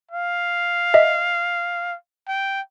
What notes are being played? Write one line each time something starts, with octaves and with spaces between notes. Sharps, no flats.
F5
D#5 E5
G5